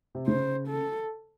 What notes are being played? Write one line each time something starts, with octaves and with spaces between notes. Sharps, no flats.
C3
C#3 C5
A4